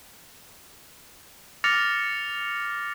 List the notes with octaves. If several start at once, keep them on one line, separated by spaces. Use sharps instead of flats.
D6 F6 A6 A#6 C#7 F7